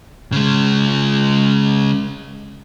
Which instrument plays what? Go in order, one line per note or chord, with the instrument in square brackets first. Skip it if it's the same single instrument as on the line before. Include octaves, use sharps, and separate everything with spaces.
[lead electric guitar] C#3 G#3